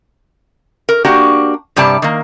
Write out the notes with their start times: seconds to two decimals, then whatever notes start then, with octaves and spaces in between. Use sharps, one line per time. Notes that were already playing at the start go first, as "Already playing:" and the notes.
0.89 A#4
1.05 A#3 D4 F#4 G4
1.76 G2 C3 G3 D5 A5
2.02 D#3 A#3